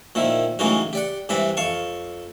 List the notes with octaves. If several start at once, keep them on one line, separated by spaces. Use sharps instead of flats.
A#2 D#3 F3 E4
A2 C#3 E3 F#3 D#4 F#4
G4 D5 F#5
G2 C3 E3 C4 B4 B5
F2 F5 A5 C#6